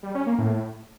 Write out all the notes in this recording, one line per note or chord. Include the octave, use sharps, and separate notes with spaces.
G3
C#4
A#3
A2